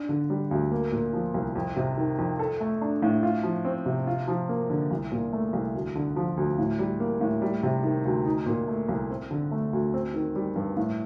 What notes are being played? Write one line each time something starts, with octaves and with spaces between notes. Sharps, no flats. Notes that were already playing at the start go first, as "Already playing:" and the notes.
Already playing: D4
D3
G3
D2
A#3
A#2
F3
C2
F2
C3
D#3
F2
A4
A3
D4
A2
F4
F3
C4
C3
F4
F3
A#3
D3
C2
A#2
A3
C2
D2
D3
F3
D2
A2
G3
A#3
A2
G3
C3
D#3
D2
D#4
A#2
A3
C2
C4
D3
A3
D2
C4
D#3
G3
G2
A2